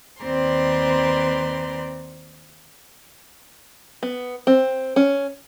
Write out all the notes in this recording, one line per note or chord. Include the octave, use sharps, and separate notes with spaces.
D#2 C4 B4 D5 A#5 C6
B3
C4
C#4